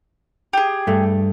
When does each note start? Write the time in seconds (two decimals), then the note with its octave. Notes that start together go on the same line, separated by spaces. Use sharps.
0.53 G4 G#4
0.87 G2 A3